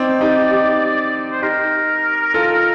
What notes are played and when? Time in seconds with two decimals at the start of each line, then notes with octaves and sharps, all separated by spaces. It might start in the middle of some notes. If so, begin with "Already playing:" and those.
Already playing: C4 D#4 D5
0.21 D#4 G4
0.51 D#4 G4
1.32 C5
1.42 D#4 G4 A#4
2.34 F4 A4